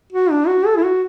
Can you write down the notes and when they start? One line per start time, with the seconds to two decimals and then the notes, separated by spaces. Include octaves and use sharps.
0.12 F#4
0.31 D4
0.48 F#4
0.66 A4
0.77 E4
0.84 F#4